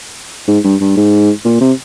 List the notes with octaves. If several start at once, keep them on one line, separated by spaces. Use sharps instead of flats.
G#2
G2
G2
G#2
A#2
C3